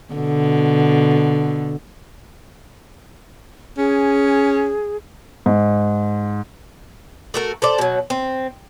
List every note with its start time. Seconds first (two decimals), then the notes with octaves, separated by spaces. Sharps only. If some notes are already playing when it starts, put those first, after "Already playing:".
0.14 B2 D3
3.78 C#4 G#4
5.46 G#2
7.34 A3 F#4 A#4
7.62 A4 C5 D5
7.78 B2 F#3
8.10 C4